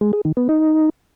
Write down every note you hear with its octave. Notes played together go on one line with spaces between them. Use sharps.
G#3
G#4
D#3
B3
D#4